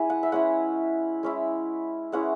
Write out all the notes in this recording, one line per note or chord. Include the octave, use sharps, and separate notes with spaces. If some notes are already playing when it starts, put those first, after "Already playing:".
Already playing: G#3 C#4 E4 G#5 B5
F#5
E5
G#3 C#4 E4 F#5
G#3 C#4 E4
G#3 C#4 E4 F#5